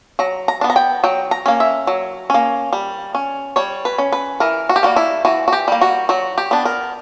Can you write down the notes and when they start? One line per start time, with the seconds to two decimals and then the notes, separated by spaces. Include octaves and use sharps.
0.19 F#3 A#5
0.48 A#5
0.61 B3 D4
0.70 A#5
0.76 G5
1.04 F#3 G5
1.31 A#5
1.46 A#3 C#4
1.60 E5
1.87 F#3
2.30 A#3 C#4
2.73 G3
3.15 C#4
3.56 G3 C#5
3.85 B4
3.98 C#4
4.12 B4
4.40 E3 A#4
4.69 F#4
4.76 G4
4.83 G3 A#3 F#4
4.96 E4
5.25 E3 F#4
5.48 F#4
5.53 G4
5.68 G3 A#3
5.81 F#4
6.09 F#3 F#4
6.38 G4
6.51 B3 D4
6.65 A#4